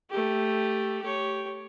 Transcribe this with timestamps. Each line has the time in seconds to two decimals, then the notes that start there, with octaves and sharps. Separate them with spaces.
0.10 A3 G4
1.02 G4 C#5